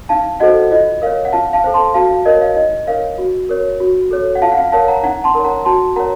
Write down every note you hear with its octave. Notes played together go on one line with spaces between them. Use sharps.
D#4 F5 A5
F#4 A4 C5 D#5 F#5
F4 D#5
A#4 C#5 F5
F#5
F4 F5 A5
F5 A5
A4 C5
A5 C6
F#4 F5 A5
F5
A#4 C#5 D#5
F5
D#4 D#5
A#4 C#5 F5
F#4
A#4 C#5
F#4
A4 C#5
F#5
F4 F5 A5
F#5
F5
A#4 C#5 F5 A5
F#5 A#5
D#4 F#5 A#5
A5 C6
A#4 C#5
F#5 A#5
F#4 A5 C6
A#4 C#5 F#5 A#5